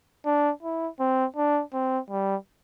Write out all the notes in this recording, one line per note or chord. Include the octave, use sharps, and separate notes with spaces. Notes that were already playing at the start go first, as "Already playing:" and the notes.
D4
E4
C4
D4
C4
G3